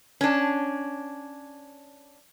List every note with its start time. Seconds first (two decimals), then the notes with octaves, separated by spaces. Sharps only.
0.21 C#4 D4